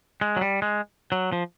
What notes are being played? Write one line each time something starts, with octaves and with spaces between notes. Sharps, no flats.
G#3
F#3
G3
G#3
F#3
F3